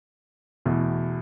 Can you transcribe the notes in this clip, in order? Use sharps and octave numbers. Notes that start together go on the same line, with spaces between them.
E2 B2 A3